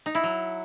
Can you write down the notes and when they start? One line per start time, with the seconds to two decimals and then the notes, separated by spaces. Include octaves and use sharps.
0.06 D#4
0.15 E4
0.24 F#3